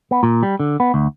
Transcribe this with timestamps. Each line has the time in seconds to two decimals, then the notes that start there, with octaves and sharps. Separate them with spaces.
0.11 B3
0.23 A#2
0.43 G3
0.60 D3
0.80 B3
0.94 D2